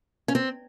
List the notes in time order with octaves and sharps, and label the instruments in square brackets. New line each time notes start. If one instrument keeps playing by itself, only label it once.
[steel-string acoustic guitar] C#4
C4